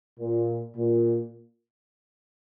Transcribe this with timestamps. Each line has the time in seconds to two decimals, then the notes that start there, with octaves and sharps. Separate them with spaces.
0.19 A#2
0.77 A#2